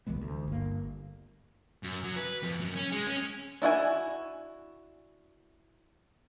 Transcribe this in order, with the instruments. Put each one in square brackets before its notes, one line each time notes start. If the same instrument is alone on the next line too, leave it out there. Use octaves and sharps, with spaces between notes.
[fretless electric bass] C#2 E3 G#3 B3
D2
G1 A#3
[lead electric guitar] F#2
F#3
B4
F2
F#2
C#4
G#3
C#4
[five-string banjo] D4 E4 F#4 G#5